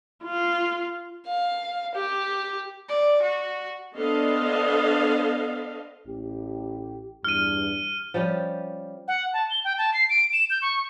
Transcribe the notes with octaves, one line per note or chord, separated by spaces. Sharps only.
F4
F5
G4
D5
F#4
B3 D4 A4 C5 D#5 F5
A1 G4
E2 G2 F6 D#7
F3 G3 C#4 G4
F#5
A5
G7
G5
A5
C7
D7
E7
G6
C#6